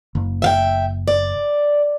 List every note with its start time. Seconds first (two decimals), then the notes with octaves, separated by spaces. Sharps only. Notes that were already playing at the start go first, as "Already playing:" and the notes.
0.15 F#1
0.42 E5 F5 G5
1.08 D5